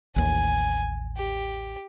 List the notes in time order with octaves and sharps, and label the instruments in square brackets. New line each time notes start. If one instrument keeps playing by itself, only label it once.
[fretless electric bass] A1 D#2 [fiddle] G#5
[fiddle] G4